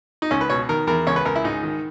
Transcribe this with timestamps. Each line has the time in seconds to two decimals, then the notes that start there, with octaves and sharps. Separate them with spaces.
0.22 D#4
0.31 C#2 C#4
0.41 B4
0.50 B2 C#5
0.69 D#3 A#4
0.87 E2 A#4
1.07 C#2 C#5
1.16 B4
1.25 C#2 A#4
1.36 E4
1.44 G#2 D#4
1.63 D#3